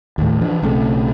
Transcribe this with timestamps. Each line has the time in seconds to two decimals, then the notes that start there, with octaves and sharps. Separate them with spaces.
0.18 D#2 A2
0.41 E3 F3 D4
0.62 B1 C#3 A3 C4